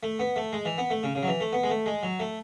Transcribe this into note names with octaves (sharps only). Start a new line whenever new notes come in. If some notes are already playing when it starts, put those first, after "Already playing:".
A3
B3
A3
G#3
E3
B3
A3
C#3
C#3
F#3
E3
A3
B3
G#3
A3
G#3
F#3
A3